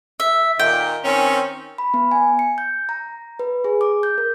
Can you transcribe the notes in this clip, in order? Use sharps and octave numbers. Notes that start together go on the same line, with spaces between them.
E5
A#2 D#3 G5
D#3 C4 C#4
B5
B3
G#5
C#7
G6
A#5
B4
G#4
D6
G6
A#4